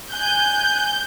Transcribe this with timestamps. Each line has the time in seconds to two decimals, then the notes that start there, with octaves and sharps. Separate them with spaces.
0.12 G#5 F#6 G6